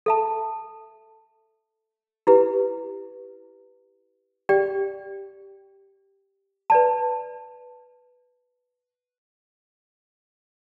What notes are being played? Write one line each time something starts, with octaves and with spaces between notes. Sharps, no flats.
A4 E5 A5
E4 G4 B4
G4 D5 G5
B4 D5 A5